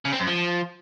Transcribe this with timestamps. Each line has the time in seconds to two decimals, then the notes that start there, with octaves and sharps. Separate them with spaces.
0.05 C#3
0.12 C4
0.20 F#2
0.27 F3